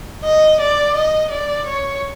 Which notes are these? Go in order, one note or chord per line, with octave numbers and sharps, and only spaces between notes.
D#5
D5
D#5
D5
C#5